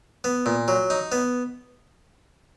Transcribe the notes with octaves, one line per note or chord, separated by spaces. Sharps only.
B3
A#2
F#3
D#4
B3